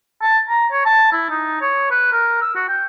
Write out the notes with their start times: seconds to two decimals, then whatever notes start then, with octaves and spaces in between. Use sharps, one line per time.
0.22 A5
0.49 A#5
0.71 C#5
0.85 A5
1.12 E4
1.30 D#4
1.61 C#5
1.91 B4
2.12 A#4
2.41 E6
2.55 F#4
2.68 G5